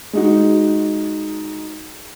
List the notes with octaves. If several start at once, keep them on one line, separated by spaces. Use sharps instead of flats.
G#3 D#4 F#4